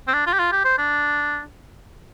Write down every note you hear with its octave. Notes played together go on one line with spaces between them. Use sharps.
C4
D4
F4
G4
F4
G4
C5
D4